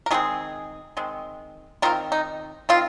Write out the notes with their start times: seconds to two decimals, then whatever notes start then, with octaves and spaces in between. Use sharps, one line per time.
0.06 A#4
0.11 D#3 G#3 C4 D#4 G#4
0.97 D#3 G#3 C4
1.82 D#3 C4 F4 A#4
2.12 D#4
2.69 D#3 C4 F4